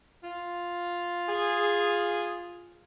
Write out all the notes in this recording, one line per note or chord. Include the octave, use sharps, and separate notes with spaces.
F4
G#4